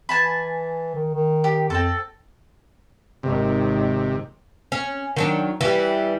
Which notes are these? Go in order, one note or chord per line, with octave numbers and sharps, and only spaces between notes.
E3 G#5 A5 B5
D#3
D#3
G4
F2 C4 A4
G#1 C3 D#3
C#4
D#3 F#3 D4
E3 G3